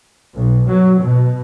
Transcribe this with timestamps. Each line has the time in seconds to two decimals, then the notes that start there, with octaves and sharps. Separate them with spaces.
0.34 B1
0.69 F#3
1.00 B2